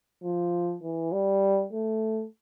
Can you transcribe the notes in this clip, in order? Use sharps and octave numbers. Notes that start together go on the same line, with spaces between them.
F3
E3
G3
A3